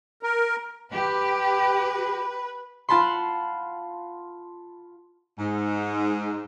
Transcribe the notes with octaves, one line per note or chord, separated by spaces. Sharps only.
A#4
G4 B4
F4 F#5 A5 B5 C6
G#2